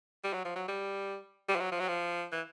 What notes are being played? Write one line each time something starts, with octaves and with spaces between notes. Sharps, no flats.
G3
F#3
F3
F#3
G3
G3
F3
F#3
F3
F#3
F3
E3